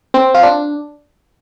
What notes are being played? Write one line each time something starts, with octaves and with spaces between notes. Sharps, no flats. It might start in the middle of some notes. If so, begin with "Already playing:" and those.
C4
F4
D4